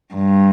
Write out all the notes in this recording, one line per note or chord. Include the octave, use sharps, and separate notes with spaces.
G2